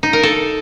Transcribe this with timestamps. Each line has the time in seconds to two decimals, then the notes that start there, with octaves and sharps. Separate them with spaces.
0.03 D#4
0.13 A#4
0.23 A4